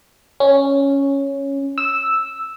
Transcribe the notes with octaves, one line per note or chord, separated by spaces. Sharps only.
C#4
E6